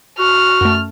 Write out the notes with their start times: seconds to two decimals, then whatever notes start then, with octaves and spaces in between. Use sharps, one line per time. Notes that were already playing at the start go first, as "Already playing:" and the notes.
0.19 F#4 F6
0.61 F#2 A3